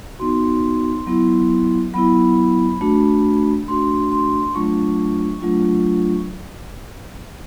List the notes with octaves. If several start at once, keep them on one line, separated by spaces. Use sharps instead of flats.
B3 D#4 F#4 C6
F#3 B3 E4
F#3 B3 E4 B5
A3 D4 F#4
A3 D4 F#4 C6
C6
F#3 A3 D4 F4 C#6
F#3 A3 D4 F4